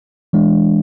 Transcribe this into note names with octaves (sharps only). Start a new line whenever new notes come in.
E3 G#3 D4